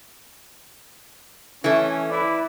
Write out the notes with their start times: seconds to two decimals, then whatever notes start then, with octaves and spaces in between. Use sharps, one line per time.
1.64 E3 A3 C#4
2.10 E4 B4 D5